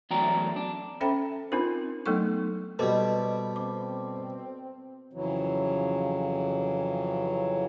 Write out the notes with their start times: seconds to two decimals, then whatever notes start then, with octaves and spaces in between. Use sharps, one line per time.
0.10 E2 F#3 A3 D5 G5 A#5
0.56 D4
1.01 C#4 A4 C5 E5 G5 B5
1.52 C4 D4 D#4 F4 A#4 C5
2.06 F#3 A3 B3 D#4 A4 C#6
2.79 B2 G3 A4 B4 C5 D#5 A5 D6
3.56 C4 D6
5.13 F2 C#3 E3 F#3